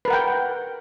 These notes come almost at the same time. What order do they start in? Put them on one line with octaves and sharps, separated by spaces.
B4 A#4 F#5 G5